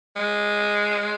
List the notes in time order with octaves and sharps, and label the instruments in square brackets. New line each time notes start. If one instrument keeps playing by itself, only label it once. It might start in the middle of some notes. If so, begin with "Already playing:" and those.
[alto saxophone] G#3